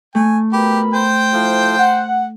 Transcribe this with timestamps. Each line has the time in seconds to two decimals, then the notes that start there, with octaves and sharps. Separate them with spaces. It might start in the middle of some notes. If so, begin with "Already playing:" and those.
0.15 A3 G#5
0.53 B2 G4 A#4 B5
0.94 C5 G5
1.32 F3 E4 A4
1.77 F#5